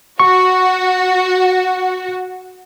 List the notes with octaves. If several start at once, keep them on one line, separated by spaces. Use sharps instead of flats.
F#4 C#6